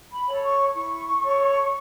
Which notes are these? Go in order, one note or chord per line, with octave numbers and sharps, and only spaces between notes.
B5
A4 C#5
C#6
E4 C#6
A4 C#5